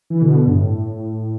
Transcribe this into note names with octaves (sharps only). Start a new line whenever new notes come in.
E3
B2 D3
G2
A2